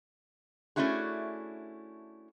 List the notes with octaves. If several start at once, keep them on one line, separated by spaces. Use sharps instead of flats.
A3 C#4 D4 E4 F#4 G#4